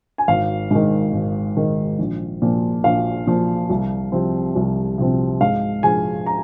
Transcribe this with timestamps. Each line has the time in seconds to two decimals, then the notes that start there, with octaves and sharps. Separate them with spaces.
0.18 G#5
0.28 G#1 F5
0.71 G#2 D#3
1.13 G#1
1.57 G#2 D#3
1.99 A#1
2.42 A#2 F3
2.84 A#1 F5
3.27 A#2 F3
3.70 C2
4.12 C3 F3 C4
4.56 C2
4.98 C3 F3 C4
5.41 G#2 F5
5.83 F3 G#3 G#5
6.26 A#5